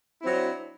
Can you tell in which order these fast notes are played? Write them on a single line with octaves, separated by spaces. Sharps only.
E4 C4 F#3 D4